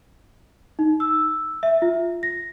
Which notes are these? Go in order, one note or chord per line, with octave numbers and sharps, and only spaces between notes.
D#4
E6
E5
F4
A#6